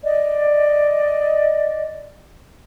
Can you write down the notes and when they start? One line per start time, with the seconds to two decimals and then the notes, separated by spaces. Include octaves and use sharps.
0.04 D5 D#5